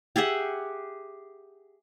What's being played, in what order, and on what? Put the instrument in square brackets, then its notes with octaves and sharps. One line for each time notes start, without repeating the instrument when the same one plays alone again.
[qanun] G4 G#4 E5 F#5